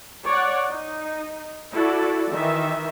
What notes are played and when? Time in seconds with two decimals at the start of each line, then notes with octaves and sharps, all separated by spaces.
0.25 C#5 D5 F#5
0.68 D#4
1.73 E4 F#4 A4 D5
2.31 D#3 E3 E5